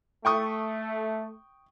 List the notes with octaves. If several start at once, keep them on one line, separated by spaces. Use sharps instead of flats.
A3 G5 C#6 D#6